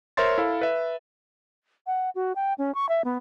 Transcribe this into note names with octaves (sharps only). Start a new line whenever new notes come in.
A#4 C5 C#5 E5 C6 A6
E4 A4 F5
B4 E5
F#5
F#4
G5
C#4
C#6
E5
B3